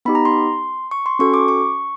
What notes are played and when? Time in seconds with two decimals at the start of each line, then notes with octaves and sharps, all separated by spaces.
0.05 B3 D#4 G4 B5
0.15 A#5
0.25 C6
0.91 C#6
1.06 C6
1.19 C#4 F#4 A4 C#6
1.34 D6
1.48 C#6